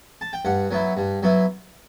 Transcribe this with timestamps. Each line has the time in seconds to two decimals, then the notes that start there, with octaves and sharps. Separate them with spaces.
0.21 A5
0.33 G5
0.45 G2 F#5
0.71 F#3 B3 E4
0.97 G2
1.23 F#3 B3 E4